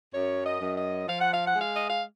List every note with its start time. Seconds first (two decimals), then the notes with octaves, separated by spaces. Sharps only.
0.13 F#2 C#5
0.45 D#5
0.61 F#2
0.77 D#5
1.08 F3 F5
1.20 F#5
1.33 F5
1.46 F#5
1.55 G#3 F5
1.75 D#5
1.89 F5